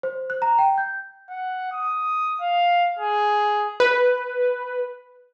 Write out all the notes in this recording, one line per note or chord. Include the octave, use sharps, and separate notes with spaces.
C5
F#6
A#5
G5
G6
F#5
D#6
F5
G#4
B4